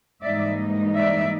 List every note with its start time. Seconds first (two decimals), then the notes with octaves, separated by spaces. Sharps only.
0.21 G#2 E3 G3 A#3 D#4 D5 E5
0.96 D5 E5